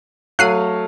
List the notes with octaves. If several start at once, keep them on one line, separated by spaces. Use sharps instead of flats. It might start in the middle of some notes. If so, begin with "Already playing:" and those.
F#3 A3 F5 F6 F#6 C7 D#7